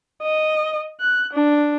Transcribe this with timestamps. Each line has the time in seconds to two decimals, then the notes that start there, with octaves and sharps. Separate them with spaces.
0.22 D#5
1.01 F#6
1.33 D4